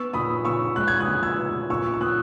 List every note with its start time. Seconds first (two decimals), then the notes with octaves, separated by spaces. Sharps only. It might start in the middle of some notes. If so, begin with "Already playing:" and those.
Already playing: B3 C#6 E6
0.14 A#2 B5 D#6
0.45 A#2 C#6 E6
0.76 G#3 F#6
0.88 G#6
1.00 D#6 F#6
1.07 A#2
1.23 E6 G#6
1.38 B3
1.70 A#2 C#6 E6
1.94 E6
2.01 A#2 D#6 F#6